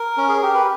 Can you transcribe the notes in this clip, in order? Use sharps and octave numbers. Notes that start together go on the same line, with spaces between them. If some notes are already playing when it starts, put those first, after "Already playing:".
Already playing: A#4
C#4
G#4
G4 A#4
B4